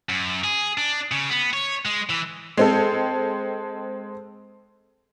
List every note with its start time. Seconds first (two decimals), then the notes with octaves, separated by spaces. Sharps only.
0.09 F#2
0.44 G#4
0.78 D4
1.11 C#3
1.30 B3
1.53 C#5
1.85 G#3
2.10 E3
2.57 G#3 C4 A4